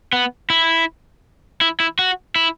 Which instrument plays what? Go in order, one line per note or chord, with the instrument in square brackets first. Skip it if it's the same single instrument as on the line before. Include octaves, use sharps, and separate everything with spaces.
[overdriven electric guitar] B3
E4
E4
E4
F#4
E4